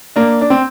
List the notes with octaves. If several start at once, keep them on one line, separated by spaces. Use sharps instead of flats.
A#3 D4
D4
C4